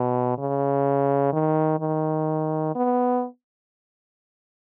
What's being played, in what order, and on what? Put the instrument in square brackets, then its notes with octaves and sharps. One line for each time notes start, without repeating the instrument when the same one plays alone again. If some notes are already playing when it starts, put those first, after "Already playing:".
Already playing: [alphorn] B2
C#3
D#3
D#3
B3